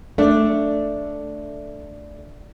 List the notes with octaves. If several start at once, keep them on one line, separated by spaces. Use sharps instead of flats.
A3 D4